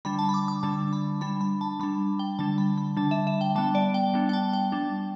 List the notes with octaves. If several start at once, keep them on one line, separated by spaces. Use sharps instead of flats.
D3 G3 D4 B5
A5
B5
D6
D6
D3 G3 D4 A5
B5
G3 D4 B5
B5
A5
G3 D4 B5
G5
D3 G3 D4 A5
B5
B5
D3 G3 D4 A5
E5
E5
G5
G3 B3 D4 A5
D5
G5
G3 B3 D4
G5
A5
G5
G3 D4